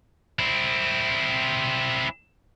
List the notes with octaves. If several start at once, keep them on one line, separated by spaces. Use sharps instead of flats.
C4 E4